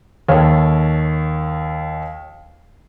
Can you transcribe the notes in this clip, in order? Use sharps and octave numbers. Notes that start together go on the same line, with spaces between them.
D#2 A4 C#5